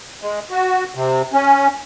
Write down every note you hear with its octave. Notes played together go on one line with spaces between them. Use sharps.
G#3
F#4
C3
C#4